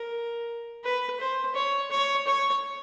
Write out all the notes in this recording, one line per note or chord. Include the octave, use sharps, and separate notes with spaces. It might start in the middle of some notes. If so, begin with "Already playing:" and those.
Already playing: A#4
B4
C5
C#5
C#5
C#5